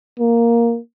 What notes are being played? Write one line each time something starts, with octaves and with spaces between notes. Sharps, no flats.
A#3